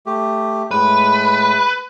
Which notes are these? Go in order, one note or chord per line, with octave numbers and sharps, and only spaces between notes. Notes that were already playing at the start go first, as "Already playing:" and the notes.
A3 G4
A2 G#3 B4